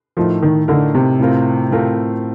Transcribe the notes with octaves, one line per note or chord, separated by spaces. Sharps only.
A2 F3 A3 D#4 A#4
D#3
A2 D3 A3 D#4 A#4
C3
A2 A3 C4 F4 A#4
A2 A3 C4 F4 A#4